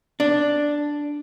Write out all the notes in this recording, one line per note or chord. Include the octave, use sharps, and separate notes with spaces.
D4